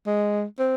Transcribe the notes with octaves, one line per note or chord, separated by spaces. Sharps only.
G#3
C4